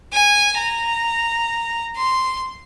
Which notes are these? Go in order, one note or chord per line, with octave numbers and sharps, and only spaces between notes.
G#5
A#5
C6